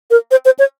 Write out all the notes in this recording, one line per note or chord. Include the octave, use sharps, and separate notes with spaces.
A#4
C5
C5
C#5